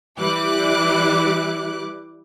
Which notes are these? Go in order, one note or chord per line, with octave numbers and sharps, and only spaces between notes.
E3 G3 E4 D6 F#6